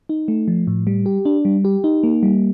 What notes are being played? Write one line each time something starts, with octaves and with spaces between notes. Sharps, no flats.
D#4
A3
F3
A2
G3
G4
D4
G3
G4
D#4
A#3
G3